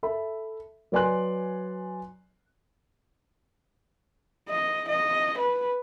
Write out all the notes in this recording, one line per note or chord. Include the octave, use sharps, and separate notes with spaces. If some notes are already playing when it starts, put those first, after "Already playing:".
A4 E5 B5
F#3 B4 D5 G#5 C6 F#6
D#5
D#5
B4